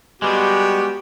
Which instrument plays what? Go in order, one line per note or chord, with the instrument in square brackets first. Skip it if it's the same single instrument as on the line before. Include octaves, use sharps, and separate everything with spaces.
[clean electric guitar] G3 G#3 [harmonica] B3 F#4 G4